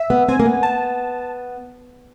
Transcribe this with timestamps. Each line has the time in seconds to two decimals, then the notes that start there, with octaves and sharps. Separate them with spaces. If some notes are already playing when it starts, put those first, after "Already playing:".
Already playing: E5
0.10 B3
0.28 C4 G#5
0.40 A#3
0.46 B3
0.63 A5